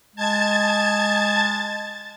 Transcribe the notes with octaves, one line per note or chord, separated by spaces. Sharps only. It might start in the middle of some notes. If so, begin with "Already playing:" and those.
G#3 A5 G#6 A6